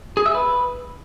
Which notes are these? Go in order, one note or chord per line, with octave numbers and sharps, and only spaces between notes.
G#4
E5
B4